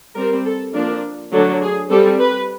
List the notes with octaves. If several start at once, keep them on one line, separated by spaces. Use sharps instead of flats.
G3 C4 A#4
A4
F3 A#3 D4 A#4
D3 F#3 A3 D4 A4
G#4
G3 C4 A4
B4